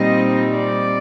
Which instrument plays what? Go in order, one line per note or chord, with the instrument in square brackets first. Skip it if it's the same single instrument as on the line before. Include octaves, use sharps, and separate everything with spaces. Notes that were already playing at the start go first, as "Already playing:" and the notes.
Already playing: [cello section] A#2 G3 C4 D#4 D#5
D5